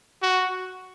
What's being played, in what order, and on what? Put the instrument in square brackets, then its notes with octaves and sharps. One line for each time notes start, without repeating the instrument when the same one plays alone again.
[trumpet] F#4